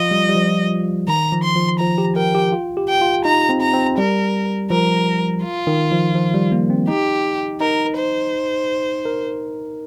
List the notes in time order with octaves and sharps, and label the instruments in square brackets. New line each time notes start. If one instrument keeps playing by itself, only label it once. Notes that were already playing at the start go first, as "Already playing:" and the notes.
Already playing: [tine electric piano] F3 F4 [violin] D#5
[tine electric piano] G3
G3
F3
[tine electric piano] D#3 [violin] A#5
[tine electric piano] F3
[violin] C6
[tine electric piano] F3
[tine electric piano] F3 [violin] A#5
[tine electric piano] G4
[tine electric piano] A#4 [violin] G5
[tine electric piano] G4
F4
G4
[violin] G5
[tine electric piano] F4
[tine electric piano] D#4 [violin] A#5
[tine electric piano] C4
[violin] A#5
[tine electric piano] C4
[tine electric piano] G3 [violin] A#4
[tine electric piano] F3 [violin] A#4
[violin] F4
[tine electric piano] D#3
F3
F3
G3
A#3
C4
[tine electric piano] D#4 [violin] G4
[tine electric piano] D#4 [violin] A#4
[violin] C5
[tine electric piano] A#4